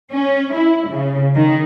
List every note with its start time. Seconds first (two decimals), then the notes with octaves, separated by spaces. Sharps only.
0.11 C#4
0.54 E4
0.90 C#3
1.35 D#3